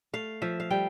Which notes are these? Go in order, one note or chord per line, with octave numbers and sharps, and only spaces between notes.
A3 F5
F3 E5
F5
G3 G5